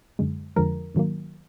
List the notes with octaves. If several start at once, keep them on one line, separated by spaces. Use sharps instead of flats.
F#2 D3 G#3
F2 D3 F3 G#3 A#4
G#2 D#3 F#3 A#3